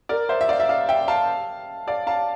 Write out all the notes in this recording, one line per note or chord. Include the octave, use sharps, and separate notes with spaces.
A#4 D5
C5 E5
E5
D5 F5
E5
D5 F5
E5 G5
F5 A5
D5 F5
F5 A5